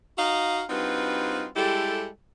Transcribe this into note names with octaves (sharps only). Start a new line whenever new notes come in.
D#4 F#4 D#5 F5
G2 C4 D#4 F4 F#4 B4
G3 G#3 E4 G4 A4